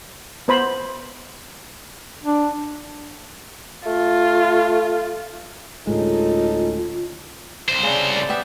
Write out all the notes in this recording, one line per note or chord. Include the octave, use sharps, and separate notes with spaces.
B3 C5 B5
D4
A3 F4
D2 A2 G#3 C#4 D#4 F4 A4
C2 C5
C#3 D4
D5
B3 G4 E5